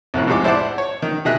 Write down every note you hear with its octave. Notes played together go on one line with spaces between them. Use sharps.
C2 F2 A2 F#6
G#1 A2 F3 G#3 D6
E4 C5 D5 F#5 A5 D6
C#5
D#3
B2 D#3 G#4 D#5 E5 F#6